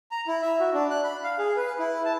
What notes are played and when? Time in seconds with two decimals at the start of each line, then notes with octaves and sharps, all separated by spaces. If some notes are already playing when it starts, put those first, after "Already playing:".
0.11 A#5
0.27 E4
0.42 E5
0.60 F#4
0.74 D4
0.90 F#6
1.04 B5
1.24 F5
1.39 G#4
1.57 B4
1.79 E4
2.05 A5